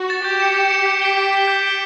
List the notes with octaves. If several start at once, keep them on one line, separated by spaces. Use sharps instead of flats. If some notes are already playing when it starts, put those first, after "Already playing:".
Already playing: F#4
A6 E7
G4 G6
C#7 E7
G6
C#7 E7
G6
B6 D7 G7
G4 G6
B6 D7 G7
G6
D7 G7